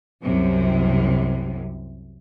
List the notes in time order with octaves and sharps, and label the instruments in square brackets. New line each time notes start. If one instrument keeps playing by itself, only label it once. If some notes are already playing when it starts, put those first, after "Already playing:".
[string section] C2 F#2 C3